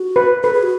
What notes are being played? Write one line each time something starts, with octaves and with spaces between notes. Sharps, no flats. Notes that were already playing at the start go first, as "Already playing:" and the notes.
Already playing: F#4
B4
A4 B4
G#4
F#4